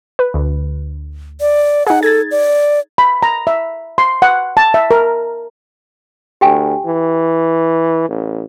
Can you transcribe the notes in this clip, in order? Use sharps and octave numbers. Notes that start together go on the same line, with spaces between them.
B4
D2
D5
D#4 G#4 F#5
A4 G#6 A6
D5
B5
A#5
E5
C6
F#5
A5
E5
A#4
D2 G4 G5 G#5
E3
A1